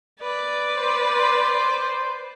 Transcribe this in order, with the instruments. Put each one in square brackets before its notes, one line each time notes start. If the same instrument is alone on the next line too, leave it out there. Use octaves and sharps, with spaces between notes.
[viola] B4 D5
[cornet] C5